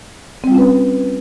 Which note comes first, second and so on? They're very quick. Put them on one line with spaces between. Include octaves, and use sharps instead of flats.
C4 G3 F4 C#4 B4